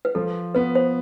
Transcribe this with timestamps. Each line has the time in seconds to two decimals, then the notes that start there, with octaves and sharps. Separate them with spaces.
0.05 B4
0.15 F3 A4
0.55 B3 B4
0.75 C5